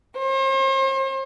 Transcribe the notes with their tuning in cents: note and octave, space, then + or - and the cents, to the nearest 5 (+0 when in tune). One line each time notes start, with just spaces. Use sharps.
C5 +40